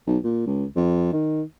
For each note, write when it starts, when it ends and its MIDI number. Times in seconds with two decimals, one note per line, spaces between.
0.07 0.18 35
0.24 0.46 46
0.47 0.65 37
0.76 1.11 41
1.13 1.42 51